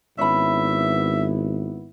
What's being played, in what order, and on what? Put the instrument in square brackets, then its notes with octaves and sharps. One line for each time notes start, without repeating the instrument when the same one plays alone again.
[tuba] G#1 [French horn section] B3 E4 [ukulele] C#4 B5 [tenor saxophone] E5